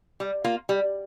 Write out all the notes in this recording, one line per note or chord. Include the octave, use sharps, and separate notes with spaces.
G3
A#3 F4
G3